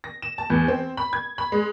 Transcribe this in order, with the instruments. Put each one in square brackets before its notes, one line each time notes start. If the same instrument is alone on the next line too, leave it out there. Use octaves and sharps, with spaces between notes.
[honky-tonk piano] A#6
E7
A5
E2
C4
B5
G#6
B5
G#3